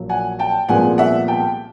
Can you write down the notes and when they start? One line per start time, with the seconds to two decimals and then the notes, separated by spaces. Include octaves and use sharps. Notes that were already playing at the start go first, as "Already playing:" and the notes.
Already playing: A#1 A#2 F#3
0.09 F#5 G#5
0.39 G5 A5
0.69 C2 A#2 F3 G#3 B3 F#5 G#5
0.98 E5 F#5
1.28 G5 A5